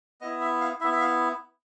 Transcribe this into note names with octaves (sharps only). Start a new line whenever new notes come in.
B3 E4 D#5
E5
F5
B3 E4 E5
E5
F5